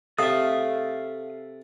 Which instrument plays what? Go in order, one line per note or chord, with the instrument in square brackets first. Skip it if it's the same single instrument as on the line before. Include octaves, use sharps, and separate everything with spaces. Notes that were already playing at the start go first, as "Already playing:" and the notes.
[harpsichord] C3 [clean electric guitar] A4 E5 [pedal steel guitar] F5 D#6